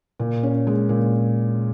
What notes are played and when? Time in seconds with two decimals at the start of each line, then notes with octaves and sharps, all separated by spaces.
0.20 A#2
0.43 C#4
0.67 G#3
0.89 A#2